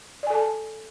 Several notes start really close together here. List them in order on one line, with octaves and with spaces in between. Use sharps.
D5 G#5 A4 A5